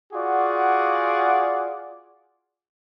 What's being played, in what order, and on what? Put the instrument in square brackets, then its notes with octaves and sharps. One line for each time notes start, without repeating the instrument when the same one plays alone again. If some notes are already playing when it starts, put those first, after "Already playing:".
[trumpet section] F4 F#4 G#4 D5 F#5